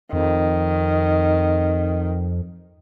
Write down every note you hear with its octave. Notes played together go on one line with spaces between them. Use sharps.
F2 D#3